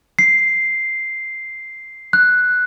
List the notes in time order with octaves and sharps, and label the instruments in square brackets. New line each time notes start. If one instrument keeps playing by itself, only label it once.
[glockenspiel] C7
F#6